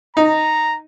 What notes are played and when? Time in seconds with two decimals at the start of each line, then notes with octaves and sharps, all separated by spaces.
0.17 D#4 A#5